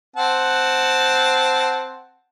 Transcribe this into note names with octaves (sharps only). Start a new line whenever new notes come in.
C4 F#5 A5